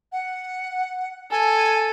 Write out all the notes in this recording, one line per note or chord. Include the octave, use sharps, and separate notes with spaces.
F#5
A4 G#5